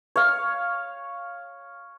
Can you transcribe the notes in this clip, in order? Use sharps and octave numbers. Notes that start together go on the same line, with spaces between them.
C#5 F5